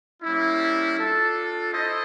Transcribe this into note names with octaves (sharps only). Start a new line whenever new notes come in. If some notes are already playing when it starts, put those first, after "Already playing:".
G3 A#3 C#4 E4
D4 F4 A4
E4 A4 C5 D#5